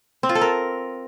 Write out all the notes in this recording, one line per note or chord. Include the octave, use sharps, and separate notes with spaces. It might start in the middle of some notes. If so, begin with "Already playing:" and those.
C4
F4
A4
A#4